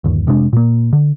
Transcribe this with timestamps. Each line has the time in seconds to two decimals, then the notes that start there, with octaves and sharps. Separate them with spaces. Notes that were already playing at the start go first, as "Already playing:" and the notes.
0.04 G1 D#2
0.27 F1 C3 G#3 D4
0.53 A#2 A#3
0.93 D3